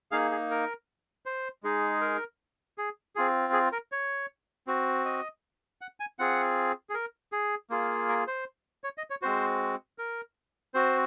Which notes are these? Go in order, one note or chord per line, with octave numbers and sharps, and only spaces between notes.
A#3 D#4 G#4 F5
G#4
A#4
C5
G#3 D#4 G#4
A#4
G#4
C4 F4 G#4
G#4
A#4
C#5
C4 F#4
D#5
F#5
G#5
C4 F4 G#4 F#5
G#4
A#4
G#4
A#3 F4 G#4
A#4
C5
C#5
D#5
C#5
G#3 C4 F#4 C5
A#4
C4 F#4 C5